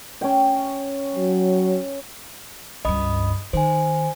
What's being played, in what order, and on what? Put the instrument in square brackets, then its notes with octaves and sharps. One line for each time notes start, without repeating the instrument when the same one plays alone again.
[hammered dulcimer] C#4 G5
[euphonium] F#3
[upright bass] C#2 G2 [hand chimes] D#5 B5 D#6
[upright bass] D#3 [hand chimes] C5 G#5